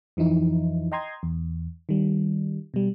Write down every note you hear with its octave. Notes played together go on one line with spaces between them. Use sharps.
F2 E3 F3 D#4 E4
D#5 G5 A#5 C6 D#6 G#6
E2
D#3 G3
B2 G3